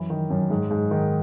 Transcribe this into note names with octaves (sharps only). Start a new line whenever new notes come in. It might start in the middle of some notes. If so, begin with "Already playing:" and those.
Already playing: F#2 E3
D#3
F#2
G#2
G#2
D#3